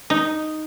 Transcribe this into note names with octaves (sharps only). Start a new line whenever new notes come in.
D#4